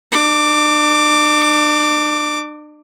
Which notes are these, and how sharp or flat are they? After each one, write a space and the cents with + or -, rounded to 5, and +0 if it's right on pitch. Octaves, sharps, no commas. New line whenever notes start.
D4 +40 D6 +0